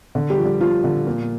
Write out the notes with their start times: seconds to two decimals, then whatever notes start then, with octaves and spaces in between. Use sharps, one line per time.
0.15 D3
0.30 G3 G4
0.38 F3
0.45 G3 G4
0.60 F3 F4
0.84 D3
1.07 A#2